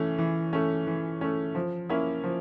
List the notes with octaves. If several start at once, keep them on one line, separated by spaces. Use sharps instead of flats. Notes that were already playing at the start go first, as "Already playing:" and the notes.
Already playing: E3 A3 C#4
E3
A3 C#4
E3
A3 C#4
F3
A#3 C#4 E4
F3